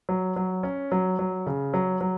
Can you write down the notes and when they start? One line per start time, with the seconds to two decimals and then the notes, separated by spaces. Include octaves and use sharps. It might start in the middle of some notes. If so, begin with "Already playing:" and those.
0.09 F#3
0.36 F#3
0.63 C#4
0.92 F#3
1.19 F#3
1.46 C#3
1.74 F#3
2.01 F#3